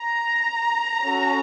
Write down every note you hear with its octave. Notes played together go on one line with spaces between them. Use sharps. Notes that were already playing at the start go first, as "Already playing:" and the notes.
Already playing: A#5
C#4 F#4 A4